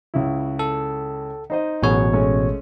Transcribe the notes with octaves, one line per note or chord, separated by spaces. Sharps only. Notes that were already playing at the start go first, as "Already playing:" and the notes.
C#2 C#3 E4
A4
D#4 C5 D#5
A1 B2 F#3 G#4 C#5
G#3 A3 C#4